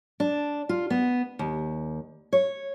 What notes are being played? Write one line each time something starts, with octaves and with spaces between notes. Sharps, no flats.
D4
F4
B3
D#2
C#5